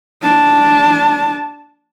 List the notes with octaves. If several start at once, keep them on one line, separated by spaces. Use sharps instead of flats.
D4 A5